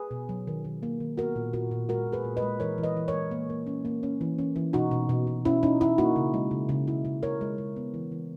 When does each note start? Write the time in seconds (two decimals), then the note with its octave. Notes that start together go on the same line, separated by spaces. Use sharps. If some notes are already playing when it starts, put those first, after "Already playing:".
Already playing: G#4 B4
0.11 B2
0.29 F#3
0.47 D#3
0.65 D#3
0.83 A#3
1.00 D#3
1.17 B3 F#4 A#4
1.36 A#2
1.53 A#2 F#4 A#4
1.71 A#2
1.89 G#3 F#4 A#4
2.07 A#2
2.12 G#4 B4
2.24 A#2
2.37 B4 D#5
2.42 G#3
2.60 E3 A#4 C#5
2.78 E3
2.83 B4 D#5
2.96 E3
3.08 A#4 C#5
3.14 G#3
3.31 A#3
3.50 A#3
3.67 C#4
3.85 A#3
4.03 C#4
4.21 E3
4.39 C#4
4.56 E3
4.73 B2 D#4 F#4
4.91 B2
5.09 B2
5.27 B2
5.45 C#4 E4
5.63 C#4 D#4
5.81 C#4 E4
5.98 A#3 D#4 F#4
6.16 C#3
6.34 G#3
6.51 C#3
6.69 C#3
6.87 C#3 E4
7.05 C#3
7.23 C#3 A#4 C#5
7.41 G#3
7.58 G#3
7.76 B3
7.94 E3
8.12 E3